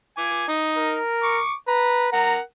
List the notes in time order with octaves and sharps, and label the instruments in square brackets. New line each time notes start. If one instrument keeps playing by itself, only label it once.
[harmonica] G#5 D6
D#4
[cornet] A#4
[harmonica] C#6 D6
[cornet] B4 [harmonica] A#5
[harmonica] A#4 F#5 [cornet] A#5